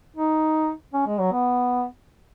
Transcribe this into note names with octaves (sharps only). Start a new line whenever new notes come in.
D#4
C#4
G#3
F#3
B3